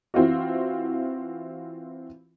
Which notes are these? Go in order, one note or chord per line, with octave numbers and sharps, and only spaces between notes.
E3 C4 F4 F#4